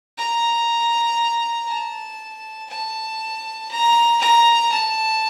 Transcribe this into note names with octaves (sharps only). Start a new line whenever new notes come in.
A#5
A5
A5
A#5
A#5
A5